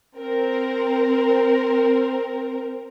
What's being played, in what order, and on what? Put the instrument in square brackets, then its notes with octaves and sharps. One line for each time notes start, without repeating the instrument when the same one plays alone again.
[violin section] C4 A#4